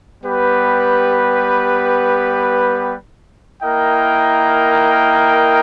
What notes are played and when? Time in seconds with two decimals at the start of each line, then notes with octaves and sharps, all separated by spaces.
0.23 G3 B3 G4 B4
3.63 A#3 E4 A#4 D#5 G5